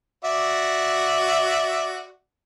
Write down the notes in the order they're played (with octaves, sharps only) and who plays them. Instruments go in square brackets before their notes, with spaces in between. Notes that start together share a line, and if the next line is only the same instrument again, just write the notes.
[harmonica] F#4 D5 E5